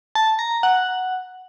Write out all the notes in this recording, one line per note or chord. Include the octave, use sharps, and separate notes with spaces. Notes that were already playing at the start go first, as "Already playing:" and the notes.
A5
A#5
F#5